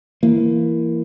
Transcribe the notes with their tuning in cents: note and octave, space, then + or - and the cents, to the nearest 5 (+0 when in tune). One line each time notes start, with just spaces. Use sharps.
E3 +20 A#3 -5